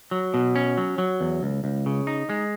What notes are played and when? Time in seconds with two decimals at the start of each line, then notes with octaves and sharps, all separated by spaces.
0.11 F#3
0.34 B2
0.56 C#4
0.77 F#3
0.98 F#3
1.21 E2
1.43 C#2
1.64 C#2
1.86 C#3
2.07 D#4
2.30 G#3